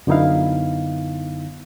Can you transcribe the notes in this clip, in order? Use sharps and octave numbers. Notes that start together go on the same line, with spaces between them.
F#2 D3 B3 D#4 E4 F5